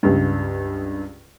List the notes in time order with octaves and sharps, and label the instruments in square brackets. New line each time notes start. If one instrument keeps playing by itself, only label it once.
[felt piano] C#2 G2